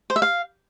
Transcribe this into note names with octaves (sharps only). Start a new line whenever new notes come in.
C5
E5
F5